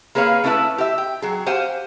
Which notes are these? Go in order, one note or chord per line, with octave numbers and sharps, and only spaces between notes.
A#3 G#4 B4 C#5 F5
A3 C#4 E4 B4 E5 A5
G4 E5
G5
F#3 G#4
G4 C5 F5 F#5 G#5